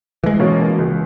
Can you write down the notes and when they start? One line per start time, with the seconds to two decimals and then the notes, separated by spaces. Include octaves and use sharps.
0.24 E3 G#3
0.39 B2 A#3 C#4
0.79 C#2